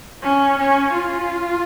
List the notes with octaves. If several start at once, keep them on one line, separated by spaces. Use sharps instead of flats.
C#4
C#4
F4